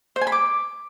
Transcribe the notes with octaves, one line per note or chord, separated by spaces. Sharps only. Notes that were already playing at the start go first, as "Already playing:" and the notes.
C5
G#5
B5
D6